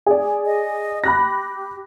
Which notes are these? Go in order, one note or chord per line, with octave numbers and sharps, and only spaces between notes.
G#4 D5
D#5
G4 B5 F#6 A#6